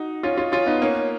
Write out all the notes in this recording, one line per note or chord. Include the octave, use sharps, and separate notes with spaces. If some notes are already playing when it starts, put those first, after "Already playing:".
Already playing: D#4 F#4
C#4 F4
C#4 F4
C#4 F4
B3 D#4
A#3 C#4